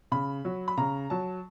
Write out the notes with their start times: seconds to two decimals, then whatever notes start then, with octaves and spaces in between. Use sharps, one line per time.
0.12 C#3 B5
0.45 F#3
0.68 B5
0.77 C#3 A#5
1.10 F#3 A5